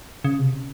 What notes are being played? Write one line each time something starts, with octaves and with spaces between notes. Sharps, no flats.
C#3
C3
C#3